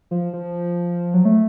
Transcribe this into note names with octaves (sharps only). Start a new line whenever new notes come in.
F3
F3
F#3
A3